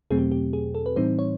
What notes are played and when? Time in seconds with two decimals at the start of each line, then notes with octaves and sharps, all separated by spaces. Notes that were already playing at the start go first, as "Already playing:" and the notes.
0.11 E2 B2 F#3 A3 C4 G#4
0.19 G4
0.31 G4
0.53 G#4
0.75 A4
0.86 B4
0.96 A2 E3 G3 C4 D#4 C5
1.19 C#5